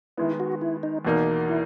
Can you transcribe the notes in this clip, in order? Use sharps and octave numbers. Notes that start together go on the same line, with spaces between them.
D#3 G#3 B3 E4
F#4
E4
D#4
E2 B2 A#3 D#4
E4